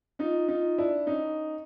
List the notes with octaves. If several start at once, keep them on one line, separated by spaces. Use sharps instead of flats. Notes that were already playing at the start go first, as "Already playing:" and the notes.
D#4 F4
D#4 F4
D4 E4
C#4 D#4